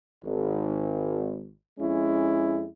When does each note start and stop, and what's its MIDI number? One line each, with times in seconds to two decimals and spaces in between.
0.24 1.52 32
1.79 2.67 41
1.79 2.67 56
1.79 2.67 61
1.79 2.67 64